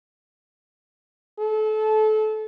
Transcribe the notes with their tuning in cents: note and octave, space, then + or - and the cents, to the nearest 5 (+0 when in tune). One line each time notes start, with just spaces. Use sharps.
A4 -30